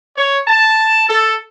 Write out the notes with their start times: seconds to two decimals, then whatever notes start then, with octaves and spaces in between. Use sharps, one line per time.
0.17 C#5
0.47 A5
1.09 A4